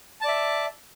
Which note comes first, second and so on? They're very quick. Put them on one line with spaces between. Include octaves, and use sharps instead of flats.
A5 D5 E5